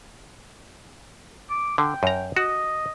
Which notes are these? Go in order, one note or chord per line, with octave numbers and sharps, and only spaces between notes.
D6
D3 G5
F#2 A#5
F#4 D#5